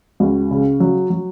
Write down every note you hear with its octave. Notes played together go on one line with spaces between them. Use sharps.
C#2 F#4
C#3
F#3
F#3